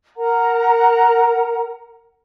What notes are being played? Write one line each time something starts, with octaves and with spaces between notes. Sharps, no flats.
A#4 F#5 A#5